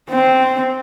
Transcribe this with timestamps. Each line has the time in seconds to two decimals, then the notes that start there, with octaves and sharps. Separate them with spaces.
0.09 C4